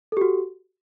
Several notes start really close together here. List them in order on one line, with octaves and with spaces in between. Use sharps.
A4 G4 F#4